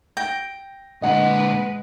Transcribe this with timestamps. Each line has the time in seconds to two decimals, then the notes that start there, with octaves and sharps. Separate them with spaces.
0.17 G5 A#6
1.02 A#2 D3 G#3 B4 D#5 F#5 F#7